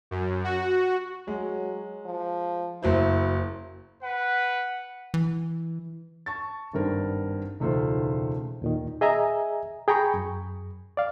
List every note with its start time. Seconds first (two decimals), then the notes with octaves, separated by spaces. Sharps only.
0.11 F#2
0.44 F#4
1.28 F#3 G#3
2.06 F3
2.83 F#1 F#3 E4 C5
4.03 B4 F#5
5.14 E3
6.26 A5 C#6 A6
6.73 G#1 G2 A#4 C5
7.60 E1 C#2 A3 D#4 F4 C5
8.62 D#2 A#2 D#3
9.01 G#4 D#5 E5 G#5 A#5
9.88 G#4 G5 A#5 B5 C#6
10.14 F#2
10.97 D5 F5